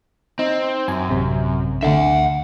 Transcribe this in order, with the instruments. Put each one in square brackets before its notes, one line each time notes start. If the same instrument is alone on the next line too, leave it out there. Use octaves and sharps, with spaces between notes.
[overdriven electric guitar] C4 [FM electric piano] D#4
[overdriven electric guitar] F#2 [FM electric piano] G#5
[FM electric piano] A1 C3
[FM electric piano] D2 D3 [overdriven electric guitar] E5 F#5